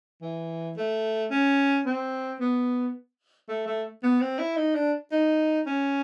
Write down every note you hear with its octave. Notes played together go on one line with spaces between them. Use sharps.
E3
A3
C#4
C4
B3
A3
A3
B3
C4
E4
D#4
D4
D#4
C#4